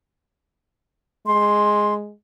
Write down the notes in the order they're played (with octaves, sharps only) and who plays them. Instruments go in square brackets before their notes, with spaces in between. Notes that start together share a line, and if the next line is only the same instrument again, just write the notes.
[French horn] G#3 [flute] C6